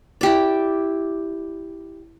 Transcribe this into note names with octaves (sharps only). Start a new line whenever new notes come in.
E4 G4 D5